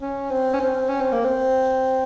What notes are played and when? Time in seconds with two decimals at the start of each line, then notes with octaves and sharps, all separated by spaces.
0.01 C#4
0.30 C4
0.54 C#4
0.60 C4
0.89 C#4
1.01 C4
1.12 A#3
1.25 C4